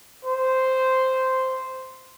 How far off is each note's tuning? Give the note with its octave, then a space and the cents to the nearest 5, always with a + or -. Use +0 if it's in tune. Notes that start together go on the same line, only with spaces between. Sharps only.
C5 -5